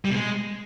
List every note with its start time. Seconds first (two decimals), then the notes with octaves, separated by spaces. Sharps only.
0.05 G3
0.10 B2
0.15 G#3